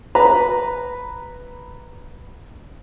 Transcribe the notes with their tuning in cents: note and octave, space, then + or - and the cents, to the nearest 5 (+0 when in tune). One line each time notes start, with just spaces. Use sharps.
B4 +0 A#5 +0